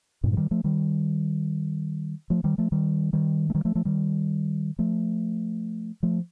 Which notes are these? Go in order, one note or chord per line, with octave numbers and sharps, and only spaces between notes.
G2 A#2
F3
D#3 G3
F3 A3
D#3 G3
F3 A3
D#3 G3
F3 A3
D#3 G3
D#3 G3
A3
D#3 G3
F3 A3
F3 A3
D#3 G3
F3 A3
F3 A3